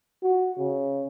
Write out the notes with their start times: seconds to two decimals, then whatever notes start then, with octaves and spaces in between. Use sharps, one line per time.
0.23 F#4
0.58 C#3